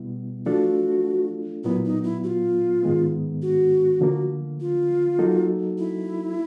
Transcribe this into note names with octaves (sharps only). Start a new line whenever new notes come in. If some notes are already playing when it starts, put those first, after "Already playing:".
Already playing: B2 G3 B3 E4
F3 A3 D4 F4 F#4 A4
A#2 F#3 B3 E4
D#4
E4
F#4
F4
G#2 D#3 G#3 B3
F#4
D3 F3 A#3
F4
F#3 A#3 D#4 F#4 A4
E4